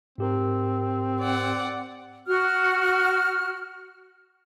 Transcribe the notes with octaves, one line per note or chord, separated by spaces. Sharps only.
G#2 C4 G4 A#4
D5 F#5
F#4 F6